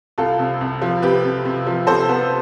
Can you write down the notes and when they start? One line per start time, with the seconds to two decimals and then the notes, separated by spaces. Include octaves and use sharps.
0.18 C2 F4 A4
0.39 C3
0.61 C2
0.82 F3
1.02 C3 G4 B4
1.24 C3
1.45 C3
1.67 F3
1.87 C3 A4 C5
2.09 B3